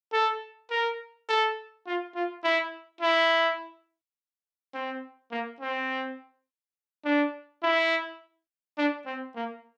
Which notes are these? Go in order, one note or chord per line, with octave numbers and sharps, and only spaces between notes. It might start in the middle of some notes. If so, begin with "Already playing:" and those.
A4
A#4
A4
F4
F4
E4
E4
C4
A#3
C4
D4
E4
D4
C4
A#3